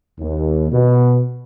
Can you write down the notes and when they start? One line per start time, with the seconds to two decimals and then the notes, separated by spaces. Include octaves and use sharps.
0.20 D#2
0.72 B2